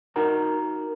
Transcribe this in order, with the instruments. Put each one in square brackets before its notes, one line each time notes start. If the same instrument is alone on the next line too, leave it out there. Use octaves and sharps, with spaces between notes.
[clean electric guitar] D#4 F#4 A#4 F#5 A#5